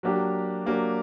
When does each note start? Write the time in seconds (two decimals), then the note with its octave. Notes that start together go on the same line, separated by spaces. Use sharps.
0.03 F#3 A#3 D4 G4
0.66 F#3 A#3 D4 G4